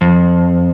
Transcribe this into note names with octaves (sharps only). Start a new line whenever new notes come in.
F2